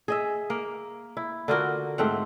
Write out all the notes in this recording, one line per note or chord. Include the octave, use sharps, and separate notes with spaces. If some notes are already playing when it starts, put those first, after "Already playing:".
G#4 D#5 E5
A#3
E4
D3 F4 F#4 A#4
G#2 A3 C4 F#5